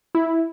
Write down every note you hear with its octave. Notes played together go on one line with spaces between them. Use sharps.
E4